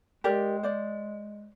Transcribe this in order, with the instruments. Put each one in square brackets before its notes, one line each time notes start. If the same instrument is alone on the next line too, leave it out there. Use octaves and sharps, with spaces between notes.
[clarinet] G#3 [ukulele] G4 A#4 D5
[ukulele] C5 D5